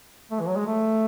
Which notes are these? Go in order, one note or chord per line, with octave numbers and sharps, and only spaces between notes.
A3
E3
F#3
G#3
A3